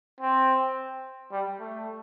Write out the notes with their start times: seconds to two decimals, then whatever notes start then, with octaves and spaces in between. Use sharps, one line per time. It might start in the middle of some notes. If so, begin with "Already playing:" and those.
0.20 C4
1.32 G3
1.60 A3